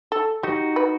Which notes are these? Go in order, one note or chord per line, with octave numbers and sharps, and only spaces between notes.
A4
D#4 F#4 G4
B4